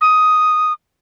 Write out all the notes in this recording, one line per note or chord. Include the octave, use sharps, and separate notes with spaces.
D#6